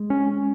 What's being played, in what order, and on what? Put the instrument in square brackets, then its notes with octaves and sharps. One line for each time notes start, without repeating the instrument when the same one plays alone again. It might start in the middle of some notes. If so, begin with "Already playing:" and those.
Already playing: [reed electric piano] G#3
[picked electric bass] C#4